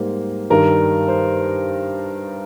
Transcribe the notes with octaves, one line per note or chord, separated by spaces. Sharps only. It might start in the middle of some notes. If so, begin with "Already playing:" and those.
Already playing: G#2 G3 A#3 C5
G2 D#3 G3 A#4
C5